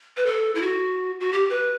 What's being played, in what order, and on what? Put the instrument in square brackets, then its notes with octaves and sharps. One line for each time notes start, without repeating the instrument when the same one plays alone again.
[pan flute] B4
A4
E4
F#4
F#4
G4
B4